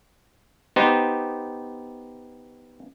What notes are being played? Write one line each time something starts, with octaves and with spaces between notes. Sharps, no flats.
B3 D#4 G4 C5